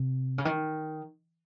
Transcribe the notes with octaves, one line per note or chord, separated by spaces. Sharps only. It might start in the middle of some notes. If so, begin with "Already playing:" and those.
Already playing: C3
C#3
D#3